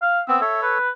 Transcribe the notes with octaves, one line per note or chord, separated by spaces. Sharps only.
F5
B3 C4 E6
A4 C#5 E5
B4